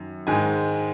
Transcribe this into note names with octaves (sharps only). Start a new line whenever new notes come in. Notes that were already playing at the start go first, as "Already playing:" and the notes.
Already playing: F#2 D#3
G#2 D#3 G#3 G#5